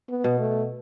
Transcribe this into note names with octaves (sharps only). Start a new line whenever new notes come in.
B3
B2
A3